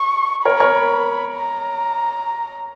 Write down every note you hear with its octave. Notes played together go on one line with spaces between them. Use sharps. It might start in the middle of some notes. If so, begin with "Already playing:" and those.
Already playing: C#6
A#4 C#5 B5
A#4 C#5
A#5